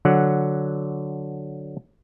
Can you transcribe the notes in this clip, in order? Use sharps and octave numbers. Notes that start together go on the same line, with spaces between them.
D3 F#3 F#5